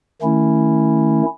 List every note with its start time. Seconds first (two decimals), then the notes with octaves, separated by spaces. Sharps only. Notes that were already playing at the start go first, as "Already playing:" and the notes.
0.22 D#3 A3 C#4 E4